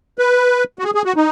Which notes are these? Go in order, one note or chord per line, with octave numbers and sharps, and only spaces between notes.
B4
F#4
G#4
G#4
F#4
D#4